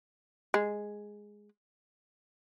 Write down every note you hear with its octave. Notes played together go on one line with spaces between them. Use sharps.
G#3